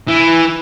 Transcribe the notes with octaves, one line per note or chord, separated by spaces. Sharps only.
E3